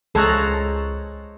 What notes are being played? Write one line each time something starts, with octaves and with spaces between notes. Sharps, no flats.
C#2 G#3 A4 C5 C#5 A#5 F#6